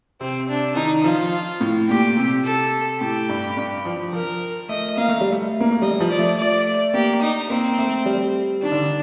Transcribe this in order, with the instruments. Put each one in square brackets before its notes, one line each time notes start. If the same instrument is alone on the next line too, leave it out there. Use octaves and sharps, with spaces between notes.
[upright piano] C3 [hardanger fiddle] C4
[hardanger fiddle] D4
[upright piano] D#3 [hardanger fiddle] D#4
[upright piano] F3 [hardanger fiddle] F4
[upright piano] A2
[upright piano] A#2 [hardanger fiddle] G4
[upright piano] C3
[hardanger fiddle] A4
[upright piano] A2 [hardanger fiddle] G4
[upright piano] G2
G2
F3
[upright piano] F3 [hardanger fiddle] A#4
[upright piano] A3 [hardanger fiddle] D#5
[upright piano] A#3 [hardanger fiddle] F5
[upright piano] A3
G3
A3
A#3
A3
[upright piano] G3 [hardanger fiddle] D#5
[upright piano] F3
[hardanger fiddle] D5
[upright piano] A3
[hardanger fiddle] D5
[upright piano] A#3 [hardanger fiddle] G4
[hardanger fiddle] D#4
[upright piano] A#3 [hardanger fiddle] C4
[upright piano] A3
G3
[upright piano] D#3 [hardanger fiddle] D4
[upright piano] D3
D#3